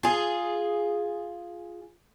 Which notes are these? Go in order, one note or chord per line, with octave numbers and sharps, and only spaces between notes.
F4 G#4